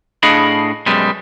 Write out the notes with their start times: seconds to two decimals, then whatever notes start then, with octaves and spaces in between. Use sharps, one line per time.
0.23 A2 D4 G#4 D#5 F5 B5
0.86 F#2 B2 G3 G#3